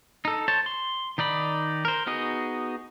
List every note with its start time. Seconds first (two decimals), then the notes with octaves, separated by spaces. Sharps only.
0.25 D#4 A4
0.48 C5 C#5 A5
0.66 C6
1.18 D#3 D#4 D5 B5
1.85 A#4 C5
2.07 B3 D#4 F#4 G#4 D#5